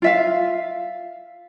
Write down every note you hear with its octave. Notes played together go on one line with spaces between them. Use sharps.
F4 E5 F5